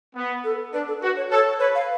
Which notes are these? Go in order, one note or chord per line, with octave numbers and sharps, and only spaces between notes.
B3
A4
D4 B4
A4
F#4 B4
C#5
A4 C#5
B4 C#5
F5